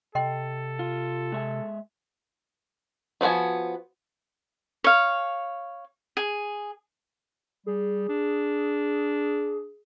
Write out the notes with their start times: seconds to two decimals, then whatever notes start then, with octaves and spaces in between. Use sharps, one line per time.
0.15 C3 A4 D#5 G5 C6
0.79 F4
1.32 G#3 E5 G#5
3.21 D#3 F3 B3 F#4 G#5
4.84 C#5 F5
6.17 G#4
7.66 G3 G#4
8.09 D4